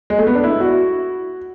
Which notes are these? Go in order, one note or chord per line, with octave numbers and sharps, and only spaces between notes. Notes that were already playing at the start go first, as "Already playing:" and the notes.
G#3
A3
B3
D4
E4
F#4